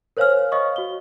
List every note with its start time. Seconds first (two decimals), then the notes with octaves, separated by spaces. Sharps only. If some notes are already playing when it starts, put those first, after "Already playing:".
0.17 A#4 C5 C#5 F5 G#5 F6
0.52 C#5 D#5 F5 C#6 D#6
0.76 F#4 G7